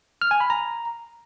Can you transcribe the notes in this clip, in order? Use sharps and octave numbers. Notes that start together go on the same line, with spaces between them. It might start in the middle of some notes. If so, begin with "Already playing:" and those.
F6
G#5
B5
A#5